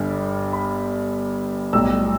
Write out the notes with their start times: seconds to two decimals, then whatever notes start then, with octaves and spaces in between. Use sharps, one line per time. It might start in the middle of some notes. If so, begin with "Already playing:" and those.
Already playing: G1 G2 G3
0.53 B5
1.73 B1 A2 G3 E6